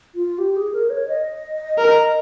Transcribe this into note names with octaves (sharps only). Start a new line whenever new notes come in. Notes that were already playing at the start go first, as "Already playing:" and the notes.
F4
G4
G#4
A#4
C#5
D#5
A#4